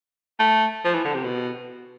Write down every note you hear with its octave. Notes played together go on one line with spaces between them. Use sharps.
A3
F3
E3
D3
C3
B2